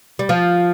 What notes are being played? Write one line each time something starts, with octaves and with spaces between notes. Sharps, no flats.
G3
F3